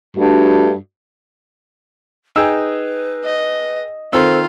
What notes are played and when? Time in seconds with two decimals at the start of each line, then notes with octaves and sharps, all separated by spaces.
0.17 G2 A3 D4 F#4
2.36 D#4 G#4 B4 G5 E6
3.25 D#5
4.13 D#3 C4 F4 A4 E6